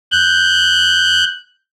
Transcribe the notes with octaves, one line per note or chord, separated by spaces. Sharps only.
F#6 G6